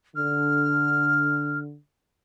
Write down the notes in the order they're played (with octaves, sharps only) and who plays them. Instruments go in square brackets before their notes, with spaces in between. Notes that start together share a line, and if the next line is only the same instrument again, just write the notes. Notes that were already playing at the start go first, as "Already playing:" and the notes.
[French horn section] D3 [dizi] F6